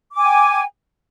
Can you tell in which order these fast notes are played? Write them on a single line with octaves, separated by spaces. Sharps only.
D6 G#5 G5